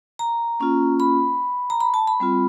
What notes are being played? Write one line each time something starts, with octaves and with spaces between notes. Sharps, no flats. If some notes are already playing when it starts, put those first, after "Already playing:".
A#5
A#3 C#4 F4
B5
A#5
B5
A5
B5
G3 C4 F4